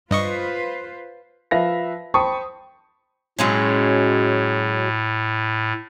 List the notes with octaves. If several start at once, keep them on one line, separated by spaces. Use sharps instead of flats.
G2 F4 B4 C5 D#5 C#6
F3 B4 E5 F5 A#6
C5 G5 A5 B5 C#6 D#6
A2 F#3 G#3 C#4